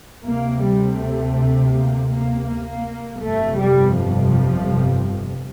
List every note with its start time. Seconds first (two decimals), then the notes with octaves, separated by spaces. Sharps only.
0.23 D2 C3 A#3
0.61 G3
0.97 A3
1.71 A#3
2.08 A#3
2.46 A#3
3.20 G1 F2 C3 A3
3.57 G3
3.94 F3